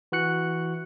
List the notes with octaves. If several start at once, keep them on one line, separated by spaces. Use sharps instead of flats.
E3 F#4 F#6 C#7